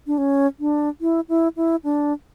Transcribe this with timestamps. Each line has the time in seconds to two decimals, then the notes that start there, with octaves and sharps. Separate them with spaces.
0.07 D4
0.18 C#4
0.60 D4
1.01 E4
1.29 E4
1.56 E4
1.84 D4